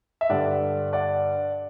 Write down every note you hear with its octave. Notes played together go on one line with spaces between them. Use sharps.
E5
G2 D3 G3 D5 F#5
D5 F#5